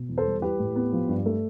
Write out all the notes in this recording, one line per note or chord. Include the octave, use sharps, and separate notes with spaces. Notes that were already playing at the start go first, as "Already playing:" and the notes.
Already playing: B2
E2
A4 C5
G3
E3 G4 B4
A2
B3
F3
G2
A3